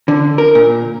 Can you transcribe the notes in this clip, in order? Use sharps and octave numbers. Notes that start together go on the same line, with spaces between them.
D3
A#4
A#2